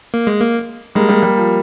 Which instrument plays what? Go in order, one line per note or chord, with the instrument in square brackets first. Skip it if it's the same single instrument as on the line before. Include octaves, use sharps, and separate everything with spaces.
[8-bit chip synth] A#3
G#3
A#3
[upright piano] G3 A#3 [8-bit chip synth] G#3
[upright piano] G3 A#3
G3
F3